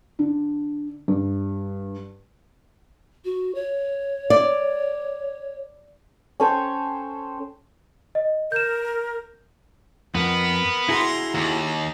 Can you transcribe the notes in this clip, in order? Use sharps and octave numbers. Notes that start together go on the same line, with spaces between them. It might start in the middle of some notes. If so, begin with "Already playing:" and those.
D3
G2
F#4
C#5
D5
C#4 A4 C5 G5
D#5
A#4 G6 E7
F2 B3 A#4
E4 F#4 G#4 A#5 C6
D#2 A#5